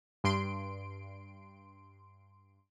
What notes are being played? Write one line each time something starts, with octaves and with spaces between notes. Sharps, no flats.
G2 C6 D7